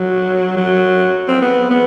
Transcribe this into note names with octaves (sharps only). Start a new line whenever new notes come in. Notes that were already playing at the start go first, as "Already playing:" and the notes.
Already playing: F#3
F#3
C4
B3
B3